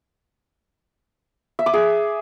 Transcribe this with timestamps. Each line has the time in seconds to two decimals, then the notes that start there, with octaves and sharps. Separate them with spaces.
1.59 E5
1.66 D6
1.74 G#4